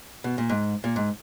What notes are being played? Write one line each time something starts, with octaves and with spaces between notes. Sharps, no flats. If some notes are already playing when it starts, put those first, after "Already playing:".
B2
A#2
G#2
A#2
G#2